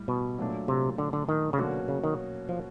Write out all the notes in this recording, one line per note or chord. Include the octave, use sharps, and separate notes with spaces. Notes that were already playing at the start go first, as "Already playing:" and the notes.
Already playing: A2 G3
B2
A#2 F#3 A3 D4
C3
D3
D3
D#3
C#3
B2 D3 F#3 A#3 C#4 F#4
C#3
D#3
F3